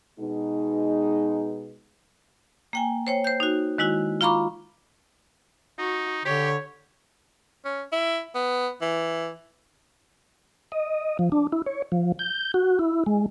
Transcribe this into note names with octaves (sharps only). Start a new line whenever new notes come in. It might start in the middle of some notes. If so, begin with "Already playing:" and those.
B2 G#3 D#4
A#3 G5 G#5
C5 C#5 G5
C5 G6
D#4 F#4
D#3 G#3 E4 F#4
F4 F5 A#5 B5 C#6 D6
D#4 F#4
D3 G4 C#5
C#4
E4
B3
E3
D#5
F3
D4
E4
C#5
F3
G6
F#4
E4
G#3